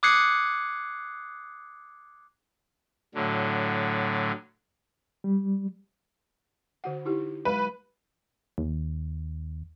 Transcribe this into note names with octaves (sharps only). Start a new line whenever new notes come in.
D6 D#6 F#6 G#6 C7 C#7
A2 D3 F#3
G3
D3 F#4 F#5
D#4 E4 G4
F#3 G#3 B4
D#2